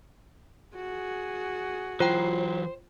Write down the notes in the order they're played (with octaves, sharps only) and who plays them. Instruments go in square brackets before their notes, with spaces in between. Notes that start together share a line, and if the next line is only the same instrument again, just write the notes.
[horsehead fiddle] F#4 G#4
[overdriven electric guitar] E3 F#3 [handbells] F4 G5 [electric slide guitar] C5